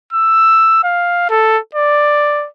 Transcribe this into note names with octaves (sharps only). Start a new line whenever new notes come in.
E6
F5
A4
D5